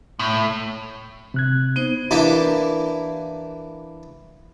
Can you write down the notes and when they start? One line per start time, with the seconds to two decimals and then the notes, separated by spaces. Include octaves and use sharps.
0.19 A2
1.34 C3 F#6 G#6
1.76 B3 D#4 C5
2.11 E3 A#3 D4 E4 G4 D6